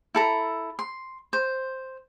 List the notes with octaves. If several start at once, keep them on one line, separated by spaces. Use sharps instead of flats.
E4 A4 A#5
C6
C5